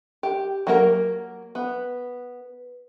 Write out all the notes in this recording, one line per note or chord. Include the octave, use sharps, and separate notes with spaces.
G4
F#3 A#3 A#4
B3